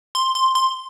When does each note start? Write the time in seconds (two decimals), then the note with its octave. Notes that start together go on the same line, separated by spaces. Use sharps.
0.15 C6
0.35 C6
0.55 C6